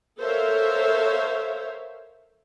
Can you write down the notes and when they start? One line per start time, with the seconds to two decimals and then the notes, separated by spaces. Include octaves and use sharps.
0.19 A4 A#4 C5 C#5 E5 F5